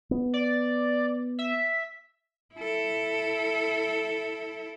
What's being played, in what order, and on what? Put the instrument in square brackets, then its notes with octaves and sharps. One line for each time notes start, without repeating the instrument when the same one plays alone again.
[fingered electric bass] B3
[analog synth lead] D5
E5
[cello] E4 A4